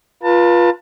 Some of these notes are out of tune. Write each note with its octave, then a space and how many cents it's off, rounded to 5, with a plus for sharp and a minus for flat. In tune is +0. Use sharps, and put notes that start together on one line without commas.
F4 +0 B4 -30 A5 +25